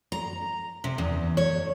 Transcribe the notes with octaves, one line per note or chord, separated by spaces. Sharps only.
A#5
C3
E2
C#5